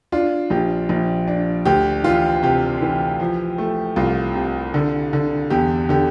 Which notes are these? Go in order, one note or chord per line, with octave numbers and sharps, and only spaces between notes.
D4 F4
A#1 G4
A#1
D4
D2 G4
E3 F4
C3 G4
E3
F3
A3
C2 F4
C3
D3
D3
E2 G4
D3 G4